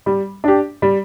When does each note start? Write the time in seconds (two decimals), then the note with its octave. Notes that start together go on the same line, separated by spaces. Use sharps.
0.06 G3
0.44 D4 G4
0.82 G3